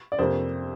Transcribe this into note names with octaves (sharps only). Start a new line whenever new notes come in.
D5
F2 C3 A#3 C5